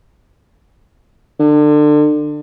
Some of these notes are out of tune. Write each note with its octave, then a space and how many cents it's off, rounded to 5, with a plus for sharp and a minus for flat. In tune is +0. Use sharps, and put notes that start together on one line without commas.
D3 +30